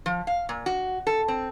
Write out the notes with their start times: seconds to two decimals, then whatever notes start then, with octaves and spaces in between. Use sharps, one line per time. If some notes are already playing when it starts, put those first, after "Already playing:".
0.06 F3
0.27 F5
0.49 A#2
0.66 F#4
1.07 A4
1.28 C4